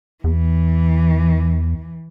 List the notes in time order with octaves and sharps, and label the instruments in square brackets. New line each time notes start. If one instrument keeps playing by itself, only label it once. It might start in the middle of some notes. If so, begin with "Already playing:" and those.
[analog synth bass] E2 [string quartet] E3